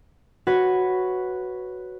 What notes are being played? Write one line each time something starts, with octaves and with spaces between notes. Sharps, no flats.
F#4 B4 C#5